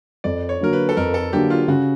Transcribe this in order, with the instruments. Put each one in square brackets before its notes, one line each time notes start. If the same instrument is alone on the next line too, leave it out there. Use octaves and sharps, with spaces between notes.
[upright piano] F2 [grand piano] D5
[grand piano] C#5
[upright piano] D3 F#3 A#3 [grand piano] A#4
[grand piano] B4
A4
[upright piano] F2 [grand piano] A#4
[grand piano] A4
[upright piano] D3 F#3 A#3 [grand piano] G4
[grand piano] F4
[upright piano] C#3 [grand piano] F#4